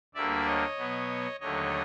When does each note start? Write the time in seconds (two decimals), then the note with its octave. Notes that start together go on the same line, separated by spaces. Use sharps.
0.15 D2 D3 G3 A#3 D5 E5
0.46 C#5 D#5
0.77 B2 F#3 B3
1.40 D#2 D3 F#3 A3 C#5 D#5